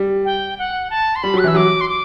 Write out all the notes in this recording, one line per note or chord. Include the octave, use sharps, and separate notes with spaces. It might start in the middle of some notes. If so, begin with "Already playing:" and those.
Already playing: G3
G5
F#5
A5
C6
G3 B5
F#3 F#6
E3 E6
F#3 D6
C6
D6